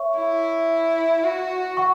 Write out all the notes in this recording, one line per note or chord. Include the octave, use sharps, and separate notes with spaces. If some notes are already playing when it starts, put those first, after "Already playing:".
Already playing: C#5 E5 C#6
E4
F#4
F#5 C#6